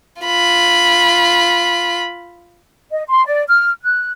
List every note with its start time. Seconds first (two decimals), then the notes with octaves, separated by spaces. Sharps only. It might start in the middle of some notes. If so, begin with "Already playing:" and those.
0.22 F4 B5
2.90 D#5
3.08 C6
3.26 D5
3.48 F6
3.82 F#6